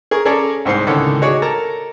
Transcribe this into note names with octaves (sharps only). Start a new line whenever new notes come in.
G#4 A#4 C#6
C#4 G#4 A4 D5 A5 A#5
C2 G#2 C5 C6
C#2 A2 D3 D#3 C#4 A4
D#4 F#4 G#4 C#5 D5
A4 A#4 A5 A#5